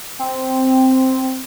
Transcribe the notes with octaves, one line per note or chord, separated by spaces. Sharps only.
C4